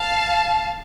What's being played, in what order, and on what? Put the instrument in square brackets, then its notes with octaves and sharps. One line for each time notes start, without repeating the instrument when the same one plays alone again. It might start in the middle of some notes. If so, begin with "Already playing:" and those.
Already playing: [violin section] F5 A5